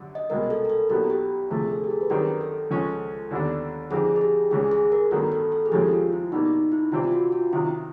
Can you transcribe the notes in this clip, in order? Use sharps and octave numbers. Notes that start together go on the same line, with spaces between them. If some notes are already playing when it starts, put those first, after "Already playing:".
Already playing: F#2 D3 G3
D#5
C2 B2 G#3 A#4
A4
A#4
A4
B1 A#2 F#3 B3 G4
G4
D2 C3 F3 A3 G#4
A4
G4
G#4
B4
F#2 D#3 G3 C4 A#4
A4
C#2 C#3 F3 G#3 C#4
D#2 D3 G3 B3 D4
F2 D3 G3 C4 D#4 G#4
G#4
G4
C#2 C#3 E3 G3 G#4
G#4
A#4
A1 G2 D#3 F#3 B3 A4
A4
A4
G#4
F2 C#3 F3 G#3 C4 G4
F4
E4
B2 G3 A#3 D#4
D#4
E4
C3 E3 G3 C4 E4 F4
F4
F#4
F4
C3 D#3 F#3 E4